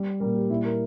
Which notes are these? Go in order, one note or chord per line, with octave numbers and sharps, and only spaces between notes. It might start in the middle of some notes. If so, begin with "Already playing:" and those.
Already playing: G3
A#2 G3 A#4
G4
A#2 G3 E4
A#4